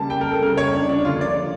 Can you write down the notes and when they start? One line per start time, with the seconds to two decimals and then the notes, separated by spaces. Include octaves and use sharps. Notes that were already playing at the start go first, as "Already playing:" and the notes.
Already playing: C#3 G3 A#3 A5
0.10 G5
0.21 A#4
0.32 A4
0.42 C#3 G3 A#3 A#4
0.57 C#5
0.74 D4
0.89 D4
1.05 D3 F3 A#3 F4
1.21 D5